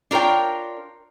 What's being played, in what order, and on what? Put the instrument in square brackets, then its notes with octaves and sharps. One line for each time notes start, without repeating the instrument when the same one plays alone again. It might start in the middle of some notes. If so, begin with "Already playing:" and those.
[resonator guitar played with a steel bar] D4 F4 A#4 C#5 G5